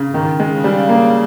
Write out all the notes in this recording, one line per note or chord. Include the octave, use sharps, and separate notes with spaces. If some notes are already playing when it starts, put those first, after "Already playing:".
Already playing: C#3
G#2 D#3
G#3
C#3
G3
A#3